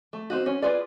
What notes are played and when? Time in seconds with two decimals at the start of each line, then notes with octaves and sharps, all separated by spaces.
0.13 A3
0.30 C4 D#4 F#4
0.46 C#4
0.62 F4 G#4 B4 D5